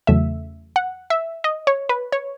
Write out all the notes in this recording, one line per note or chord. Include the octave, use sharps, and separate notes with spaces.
E2 C#3 F#3 A3 E5
F#5
E5
D#5
C#5
B4
C#5